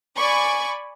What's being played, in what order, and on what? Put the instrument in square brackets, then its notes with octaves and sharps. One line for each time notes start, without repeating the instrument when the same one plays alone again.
[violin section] D5 G#5 B5 C#6 D6